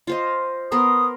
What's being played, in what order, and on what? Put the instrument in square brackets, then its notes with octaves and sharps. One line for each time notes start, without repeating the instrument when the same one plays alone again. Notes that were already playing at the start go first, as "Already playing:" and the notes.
[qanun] F4 C5 D#5
[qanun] B3 A#4 C6 [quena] D#6